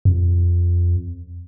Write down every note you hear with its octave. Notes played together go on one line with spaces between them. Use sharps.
F2